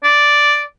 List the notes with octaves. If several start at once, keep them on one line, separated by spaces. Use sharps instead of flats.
D5